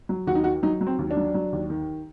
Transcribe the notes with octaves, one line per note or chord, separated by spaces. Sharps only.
F#3
D#2 F#4
D#4
D#3 F#4
F#3 D#4
F#3
C4
D#2
D4
F#3
F#3
D#2
D#3